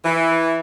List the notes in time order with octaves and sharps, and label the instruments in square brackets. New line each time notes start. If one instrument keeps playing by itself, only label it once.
[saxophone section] E3